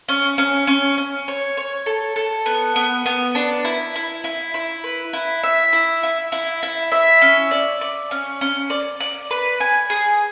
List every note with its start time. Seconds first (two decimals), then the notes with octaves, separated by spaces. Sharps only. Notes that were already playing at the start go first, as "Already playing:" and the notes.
0.09 C#4
0.38 C#4
0.67 C#4
0.98 C#4
1.28 C#5
1.57 C#5
1.86 A4
2.16 A4
2.46 B3
2.76 B3
3.06 B3
3.35 D4
3.65 E4
3.96 E4
4.24 E4
4.54 E4
4.84 B4
5.13 E4
5.43 E5
5.73 E4
6.03 E4
6.32 E4
6.63 E4
6.92 E5
7.22 C#4
7.51 D5
7.81 D5
8.11 C#4
8.41 C#4
8.70 D5
9.00 D5
9.31 B4
9.60 G#5
9.90 G#4